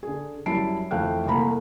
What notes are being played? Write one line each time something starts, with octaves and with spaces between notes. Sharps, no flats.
D3 G#4
F#2 G3 E4 A5 C7 D7
F2 E3 A3 F5 G5 F#6
C2 A3 A#3 A#5 B5